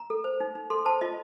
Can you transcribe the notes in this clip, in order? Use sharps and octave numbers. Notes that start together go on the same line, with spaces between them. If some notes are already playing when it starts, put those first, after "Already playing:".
Already playing: A#5
A4
C5
D#4
D#4
A4 C6
C5 A5
F4 D#5